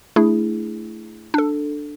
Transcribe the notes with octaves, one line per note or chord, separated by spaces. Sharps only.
A3 D4 E4 G#4
D4 A4